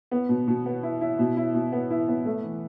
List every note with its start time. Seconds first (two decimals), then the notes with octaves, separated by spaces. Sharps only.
0.11 B3
0.29 B2
0.48 B2
0.66 B3
0.83 E4
1.01 E4
1.19 B2
1.37 E4
1.55 B2
1.72 B3
1.90 E4
2.08 B3
2.25 A3
2.44 E3